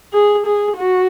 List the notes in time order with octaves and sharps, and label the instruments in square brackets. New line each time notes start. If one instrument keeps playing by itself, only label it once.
[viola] G#4
G#4
F#4